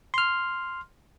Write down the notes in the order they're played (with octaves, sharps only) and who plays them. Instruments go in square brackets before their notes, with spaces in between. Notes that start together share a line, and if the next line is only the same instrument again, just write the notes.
[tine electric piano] C6 F6